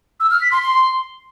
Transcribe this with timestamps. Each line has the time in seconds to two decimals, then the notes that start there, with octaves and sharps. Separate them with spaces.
0.20 E6
0.31 F6
0.41 B6
0.52 C6
0.62 C6